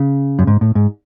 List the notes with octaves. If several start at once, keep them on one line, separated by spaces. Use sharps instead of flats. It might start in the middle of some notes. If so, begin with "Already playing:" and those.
Already playing: C#3
F#2
G#2
A2
G#2